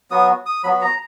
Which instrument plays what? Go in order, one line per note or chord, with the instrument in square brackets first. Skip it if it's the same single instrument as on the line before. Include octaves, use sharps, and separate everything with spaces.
[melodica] F#3 B3 F#4 D#6
D#6
F#3 B3 F#4 B5
A#5